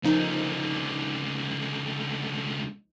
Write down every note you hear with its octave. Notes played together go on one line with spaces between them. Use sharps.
C#2 D3 F3 A#3 D#4